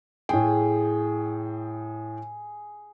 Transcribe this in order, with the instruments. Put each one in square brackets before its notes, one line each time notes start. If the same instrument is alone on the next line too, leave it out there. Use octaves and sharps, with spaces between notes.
[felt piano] A2 G5 [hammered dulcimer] G#4